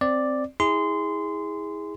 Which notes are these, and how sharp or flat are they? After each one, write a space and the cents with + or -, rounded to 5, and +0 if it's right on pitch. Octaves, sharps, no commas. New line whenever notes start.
C4 +0 D5 +0
E4 -30 G#4 -15 C6 -20